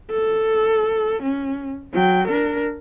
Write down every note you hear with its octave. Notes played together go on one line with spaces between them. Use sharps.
A4
C#4
F#3 G5
D4 A#4